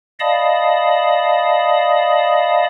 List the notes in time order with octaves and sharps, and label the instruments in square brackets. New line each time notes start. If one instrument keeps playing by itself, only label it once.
[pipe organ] D5 D#5 F5 A5 B5 D#6